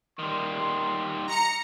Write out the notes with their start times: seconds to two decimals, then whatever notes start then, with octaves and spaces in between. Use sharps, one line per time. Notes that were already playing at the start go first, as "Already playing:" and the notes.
0.19 D#3 G3 C6
1.27 A#5 C#7